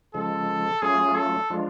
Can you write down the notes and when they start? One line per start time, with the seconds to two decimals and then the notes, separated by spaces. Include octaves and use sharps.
0.14 C#3 F3 G#3 A4
0.82 F#3 A3 C#4 F4 G#4
1.17 A4
1.50 F3 G#3 D4 F4